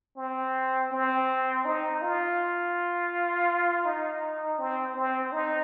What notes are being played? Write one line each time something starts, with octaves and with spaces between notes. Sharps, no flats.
C4
C4
D#4
F4
D#4
C4
C4
D#4